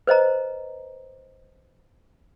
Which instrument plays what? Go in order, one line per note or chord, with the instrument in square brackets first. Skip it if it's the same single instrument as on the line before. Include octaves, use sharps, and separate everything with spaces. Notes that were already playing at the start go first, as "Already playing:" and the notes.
[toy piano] B4 C5 D#5 A#5